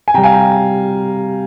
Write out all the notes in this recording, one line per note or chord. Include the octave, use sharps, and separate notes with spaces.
G#5
C3 G3 G5 A#5
F5 G#5
G5 A#5